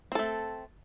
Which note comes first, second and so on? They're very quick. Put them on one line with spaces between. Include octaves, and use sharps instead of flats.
C4 A4 A3